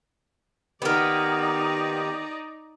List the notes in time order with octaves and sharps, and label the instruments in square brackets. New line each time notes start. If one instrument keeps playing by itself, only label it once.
[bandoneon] D#3 G4 [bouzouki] A#3 B3 [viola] D#4 D5